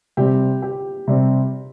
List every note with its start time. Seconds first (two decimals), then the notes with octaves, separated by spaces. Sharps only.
0.17 C3 G3 C4 G4
0.62 G4
1.08 C3 G3 C4